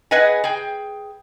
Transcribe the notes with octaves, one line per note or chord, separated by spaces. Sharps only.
G#4 B4 D#5 F#5 G#5
G#4 G5